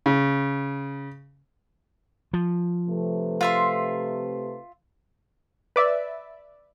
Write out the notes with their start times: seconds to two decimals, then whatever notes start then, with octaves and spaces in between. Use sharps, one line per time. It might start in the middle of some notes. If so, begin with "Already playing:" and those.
0.06 C#3
2.33 F3
2.89 C3 A3 B4
3.41 F4 E5 C6
5.76 B4 D5 E5